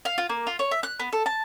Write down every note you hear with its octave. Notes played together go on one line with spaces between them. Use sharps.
F5
F4
A#3
F4
C#5
E5
F#6
B3
A4
A5